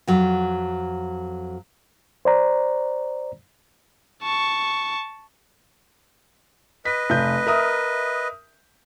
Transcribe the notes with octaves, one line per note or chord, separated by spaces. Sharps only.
F2 F#3
C5 D5 A#5
A5 C#6
B4 D#5 B6
F1 G6
A#4 E5 D#6